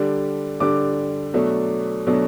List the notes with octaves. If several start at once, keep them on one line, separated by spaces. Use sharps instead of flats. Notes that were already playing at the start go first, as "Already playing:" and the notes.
Already playing: D3 G3 D4
D3 G3 D4 D6
B2 F#3 A3 D4
B2 F#3 A3 D4